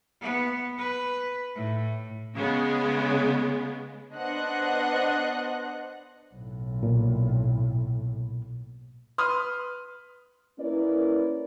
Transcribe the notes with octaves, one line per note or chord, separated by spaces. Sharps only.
B3
B4
A2
C#3 G#3 B3
B3 D4 C5 D#5 F#5 F#6
B1 A2
A#2
B4 C6 D#6 F6
A#3 C#4 E4 A#4 B4 D5